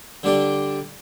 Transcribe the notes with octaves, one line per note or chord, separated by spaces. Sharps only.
D3 G3 D4 G4